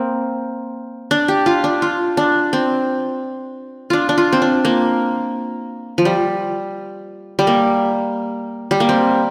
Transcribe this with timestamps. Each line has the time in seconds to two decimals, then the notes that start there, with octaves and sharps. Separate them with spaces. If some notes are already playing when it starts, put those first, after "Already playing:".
Already playing: A#3 C4
1.11 D4
1.28 G4
1.46 F4
1.64 D4
1.82 F4
2.17 D4
2.53 C4
3.90 D4 F4
4.09 D4
4.18 F4
4.33 C4
4.42 D4
4.65 A#3
5.98 F3
6.05 G3
7.39 G3
7.47 A#3
8.71 G3
8.80 A#3
8.89 C4